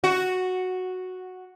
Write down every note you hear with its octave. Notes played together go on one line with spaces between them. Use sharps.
F#4